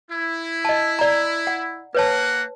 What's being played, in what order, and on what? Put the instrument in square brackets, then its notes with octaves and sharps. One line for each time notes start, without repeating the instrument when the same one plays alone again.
[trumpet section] E4
[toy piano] D#5 A5
D5 A#5
F#5
[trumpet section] A#3 F#5 [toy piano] B4 C#5 A5